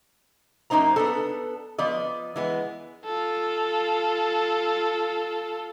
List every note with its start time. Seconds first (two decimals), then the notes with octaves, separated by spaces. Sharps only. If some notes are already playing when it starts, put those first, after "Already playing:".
0.70 F#2 A#3 D#4 C5 A#5
0.96 B3 D4 A4
1.78 F3 B3 D5 D#5
2.36 E3 G#3 B3
3.05 F4 A4